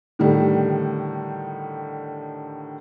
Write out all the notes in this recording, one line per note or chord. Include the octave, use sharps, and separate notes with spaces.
A2 D3 D#3 G3